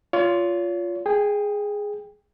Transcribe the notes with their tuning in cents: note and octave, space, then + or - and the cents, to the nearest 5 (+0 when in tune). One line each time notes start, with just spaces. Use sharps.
F4 +0 C#5 +35
G#4 +0 G5 +20